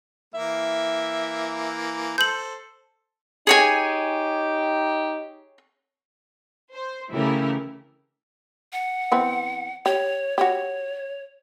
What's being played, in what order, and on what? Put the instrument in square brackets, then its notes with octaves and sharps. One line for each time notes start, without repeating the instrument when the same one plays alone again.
[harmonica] E3 A#3 [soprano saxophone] E5
[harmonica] A4 C5 [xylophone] G6 F#7
[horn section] D#4 G4 [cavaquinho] G#4 C#5 G#5
[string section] C5
C#3 E3 A3 E4 G4 A#4
[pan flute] F#5
[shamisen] E3 B3 C4
[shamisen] G4 [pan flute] C#5
[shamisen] F#4 G4 [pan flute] C#5